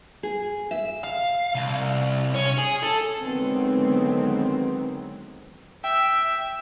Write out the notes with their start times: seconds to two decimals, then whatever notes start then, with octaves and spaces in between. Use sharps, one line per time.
0.23 G#4
0.71 E5
1.04 F5
1.55 C2
2.34 C#4
2.58 G#4
2.83 A4
3.20 D3 D#3 F#3 G#3 B3 C4
5.84 E5 G5